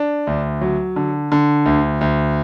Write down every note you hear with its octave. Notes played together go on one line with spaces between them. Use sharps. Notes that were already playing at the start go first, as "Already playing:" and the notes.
Already playing: D4
D2
F#3
D3
D3
D2
D2